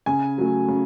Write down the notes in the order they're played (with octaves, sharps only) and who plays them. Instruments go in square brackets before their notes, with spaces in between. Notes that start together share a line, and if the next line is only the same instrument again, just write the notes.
[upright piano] C#3 G#5
F#3 A3
C#3